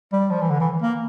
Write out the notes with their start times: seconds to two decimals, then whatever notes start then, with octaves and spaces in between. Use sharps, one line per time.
0.13 G3
0.31 F3
0.41 E3
0.50 D3
0.60 E3
0.82 A#3